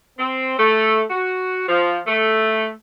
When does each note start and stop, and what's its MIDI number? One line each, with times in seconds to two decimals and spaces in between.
0.19 0.56 60
0.59 1.02 57
1.11 1.63 66
1.68 1.99 53
2.07 2.70 57